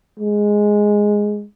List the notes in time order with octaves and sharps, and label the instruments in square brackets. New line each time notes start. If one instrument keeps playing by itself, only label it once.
[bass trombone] G#3